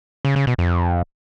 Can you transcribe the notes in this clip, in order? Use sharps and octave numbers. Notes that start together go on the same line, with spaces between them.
C#3
C#3
B2
F2